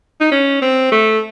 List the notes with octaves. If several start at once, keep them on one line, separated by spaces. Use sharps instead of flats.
D#4
C#4
C4
A3